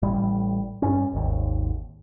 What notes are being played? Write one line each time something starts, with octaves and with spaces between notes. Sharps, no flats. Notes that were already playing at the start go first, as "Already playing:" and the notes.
A1 A2 G3
G2 C#4
G#1 D#2